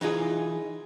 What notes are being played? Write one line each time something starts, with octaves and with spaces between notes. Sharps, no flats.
E3 D#4 F4 G#4